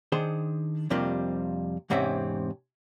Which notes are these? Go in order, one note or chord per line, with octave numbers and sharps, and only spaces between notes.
D#3 D4 G#4 C5 C6
F2 C3 G3 A#3 D4 F4
E2 G#2 C3 C4 C#4 E5